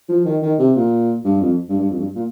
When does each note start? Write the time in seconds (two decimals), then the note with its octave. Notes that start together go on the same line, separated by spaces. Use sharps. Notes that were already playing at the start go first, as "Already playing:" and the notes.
0.09 F3
0.25 D#3
0.42 D#3
0.59 C3
0.76 A#2
1.25 G2
1.41 F2
1.69 G2
1.80 G2
1.91 F2
1.99 G2
2.16 A#2